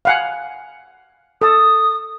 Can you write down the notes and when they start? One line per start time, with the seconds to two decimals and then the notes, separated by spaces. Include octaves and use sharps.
0.05 F5 F#5 G#5
1.42 A4 A5 D#6